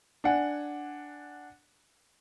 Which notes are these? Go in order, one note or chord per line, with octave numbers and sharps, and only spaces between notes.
D4 F#5 G#5